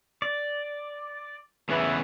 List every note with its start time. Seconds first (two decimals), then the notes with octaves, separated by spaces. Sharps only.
0.22 D5
1.69 E2 C#3 E3 B3